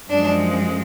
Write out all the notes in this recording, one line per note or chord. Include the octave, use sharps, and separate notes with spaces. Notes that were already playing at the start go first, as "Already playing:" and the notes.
F#2 F3 G#3 D4